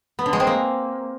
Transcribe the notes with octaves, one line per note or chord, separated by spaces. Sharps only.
B3
D3
G#3
C4
A#3